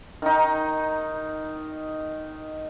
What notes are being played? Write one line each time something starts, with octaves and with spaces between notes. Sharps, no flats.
D#3 D#4